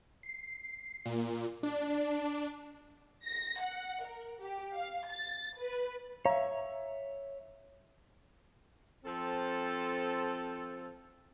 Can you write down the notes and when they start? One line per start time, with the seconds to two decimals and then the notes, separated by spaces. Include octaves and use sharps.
0.23 C7
1.05 A#2
1.63 D4
3.27 A#6
3.62 F#5
4.06 A#4
4.41 G4
4.75 F5
5.10 A6
5.60 B4
6.25 C#5 E5 F5 A#5
9.05 F3 C4 A4